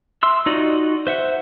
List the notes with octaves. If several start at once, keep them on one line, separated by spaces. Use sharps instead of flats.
E5 C6 E6
D#4 F4 F#4 D5 D#5
C5 E5 F#5